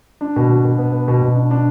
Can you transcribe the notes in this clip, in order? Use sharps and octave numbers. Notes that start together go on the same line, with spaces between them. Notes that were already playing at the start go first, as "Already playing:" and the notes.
D4
B2
B2
B2
B3
B3
B2
B2
D4
D4